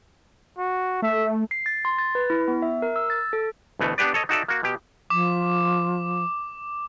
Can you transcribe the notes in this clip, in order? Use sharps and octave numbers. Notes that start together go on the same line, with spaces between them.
F#4
A3 E5
C7
A6
C6
A6
B4
E4
B3
E5
A#4
E6
A6
A4
D2 B2 E3 A3
B3 D4 G4 B4 D5
A4 C#5 D#5
D#4 F#4 A4 D5 E5
A#3 F#4
B2 G4
F3 D6